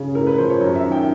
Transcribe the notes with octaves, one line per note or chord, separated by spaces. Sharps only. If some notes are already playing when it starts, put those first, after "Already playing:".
Already playing: C#3
A2 A#4
B4
F3 C5
C#5
F#2
E5
D#3
G5